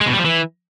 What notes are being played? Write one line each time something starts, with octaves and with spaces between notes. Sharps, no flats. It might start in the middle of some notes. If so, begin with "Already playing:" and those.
G#3
B2
G3
F3
E3